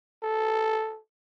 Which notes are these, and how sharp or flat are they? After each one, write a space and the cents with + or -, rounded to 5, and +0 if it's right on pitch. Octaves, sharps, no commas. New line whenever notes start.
A4 -5